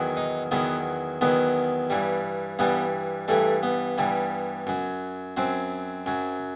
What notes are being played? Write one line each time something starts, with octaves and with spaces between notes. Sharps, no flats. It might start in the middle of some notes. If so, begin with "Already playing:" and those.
Already playing: E2 D#3 F#3
D#4
E2 D#3 F#3 B3
E2 D#3 F#3 B3
G2 E3 G3
G2 E3 G3 B3
G2 E3 G3 A3
B3
G2 E3 G3
F#2 F#3
F#2 F#3 C4
F#2 F#3